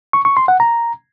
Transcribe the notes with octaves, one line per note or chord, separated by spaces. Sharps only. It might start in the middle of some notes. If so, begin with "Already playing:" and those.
C#6
C#6
C6
F#5
A#5